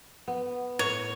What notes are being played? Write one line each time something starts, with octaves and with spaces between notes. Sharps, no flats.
B3
A2 C#5